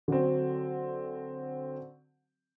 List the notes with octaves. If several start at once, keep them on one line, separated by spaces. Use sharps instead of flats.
D3 F#3 C4